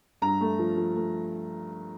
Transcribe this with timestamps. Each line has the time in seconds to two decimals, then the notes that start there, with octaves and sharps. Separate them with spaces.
0.22 G2 A#5
0.41 A3
0.59 F3
0.77 F3
0.96 A3